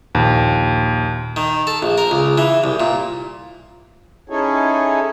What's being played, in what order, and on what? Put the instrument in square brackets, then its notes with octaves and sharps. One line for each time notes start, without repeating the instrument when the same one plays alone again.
[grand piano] A#1 A#2 [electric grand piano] D#2
[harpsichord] D#3
A4
A#1
A#4
C#2
E3
C2
A#2
[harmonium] C#4 D#4 E4 G#4 A4 C#5